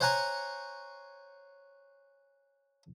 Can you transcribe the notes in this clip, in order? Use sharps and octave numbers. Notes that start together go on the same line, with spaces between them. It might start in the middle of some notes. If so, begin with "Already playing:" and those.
C5 C#5 F#5 G#5 A#5 C#6